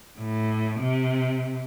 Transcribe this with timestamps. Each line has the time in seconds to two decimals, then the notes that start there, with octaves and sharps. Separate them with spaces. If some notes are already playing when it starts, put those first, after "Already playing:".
0.19 A2
0.81 C3